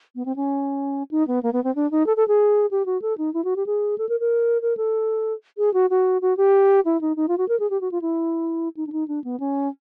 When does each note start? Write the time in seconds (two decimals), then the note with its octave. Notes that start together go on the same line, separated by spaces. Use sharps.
0.16 B3
0.26 C4
0.36 C#4
1.11 D#4
1.27 B3
1.43 A#3
1.53 B3
1.64 C4
1.75 D4
1.91 D#4
2.06 A4
2.17 A4
2.28 G#4
2.71 G4
2.86 F#4
3.02 A4
3.18 D#4
3.34 E4
3.44 F#4
3.56 G4
3.66 G#4
3.98 A4
4.09 A#4
4.20 A#4
4.62 A#4
4.77 A4
5.58 G#4
5.74 F#4
5.90 F#4
6.22 F#4
6.37 G4
6.85 E4
7.01 D#4
7.16 D#4
7.28 F4
7.38 F#4
7.48 A#4
7.60 G#4
7.70 G4
7.81 F#4
7.92 F4
8.02 E4
8.77 D#4
8.87 D4
8.92 D#4
9.08 D4
9.24 B3
9.40 C#4